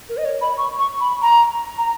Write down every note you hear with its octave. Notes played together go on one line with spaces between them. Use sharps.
A#4
D#5
C#5
B5
C#6
C#6
B5
A#5
A#5